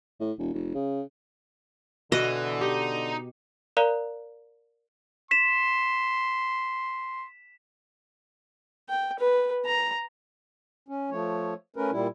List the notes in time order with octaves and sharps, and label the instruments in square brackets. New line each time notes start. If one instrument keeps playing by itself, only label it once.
[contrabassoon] A2
E1
F1
C#3
[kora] B2 F#5 [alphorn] D3 [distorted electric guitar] E3 [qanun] D#5
[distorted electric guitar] D#4 [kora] G4
[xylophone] A#4 D5 F5 A#5 F#6 G7
[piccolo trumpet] C6 [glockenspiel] B6 E7
[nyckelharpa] G5
B4
A#5
[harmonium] C#4
F3 A3 C#5
A3 C#4 A#4 B4
A#2 G3 E4